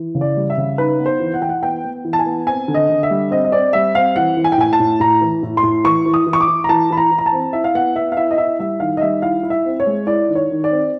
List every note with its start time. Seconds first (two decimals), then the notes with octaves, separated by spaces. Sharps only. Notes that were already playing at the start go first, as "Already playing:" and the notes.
Already playing: E3
0.15 C#3
0.21 D5
0.36 G3
0.50 E5
0.57 C#3
0.78 D#4 B4
0.99 B3
1.06 C5
1.20 E3
1.34 F#5
1.41 E3 G5
1.49 F#5
1.63 B3 G5
1.84 B3
2.04 E3
2.13 A5
2.19 G#5
2.26 B3
2.47 C4 G#5
2.68 D3
2.74 D#5
2.89 D3
3.03 E5
3.10 G3
3.31 C4 D#5
3.45 D#5
3.52 C4 D5
3.73 G3 E5
3.95 C4 F5
4.16 E3 F#5
4.37 E3
4.44 G#5
4.52 G5
4.58 A2 G#5
4.73 A5
4.80 A2
5.00 A2 A#5
5.21 E3
5.43 A2
5.57 C6
5.63 A2
5.84 E3 C#6
6.06 E3
6.14 D#6
6.27 E3
6.33 C#6
6.41 D6
6.48 E3
6.64 A#5
6.69 E3 A5
6.90 E3 B5
6.97 A#5
7.11 E3
7.18 A#5
7.26 A5
7.32 C4
7.53 E4 E5
7.64 F5
7.75 B3 F#5
7.95 B3 E5
8.12 F5
8.17 E4 E5
8.31 D#5
8.38 E4 E5
8.59 G3 E5
8.80 D#3 F5
8.97 D#5
9.01 G3 E5
9.22 E4 F5
9.43 E4
9.50 E5
9.65 C4
9.80 C#5
9.86 G#3
10.07 E4 D5
10.29 D#3
10.35 C#5
10.50 D#3
10.64 D5
10.71 C4